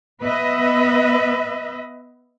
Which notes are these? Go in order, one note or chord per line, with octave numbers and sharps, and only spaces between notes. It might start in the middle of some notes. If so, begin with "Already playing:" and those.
B3 B4 D#5 E5